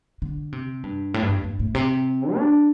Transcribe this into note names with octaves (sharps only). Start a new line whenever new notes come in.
D3
C3
G2
A2
G2
F2
G2
A2
C3
D4